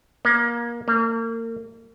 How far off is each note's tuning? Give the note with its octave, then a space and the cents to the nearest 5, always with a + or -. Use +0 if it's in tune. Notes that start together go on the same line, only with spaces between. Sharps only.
A#3 +25
A#3 -35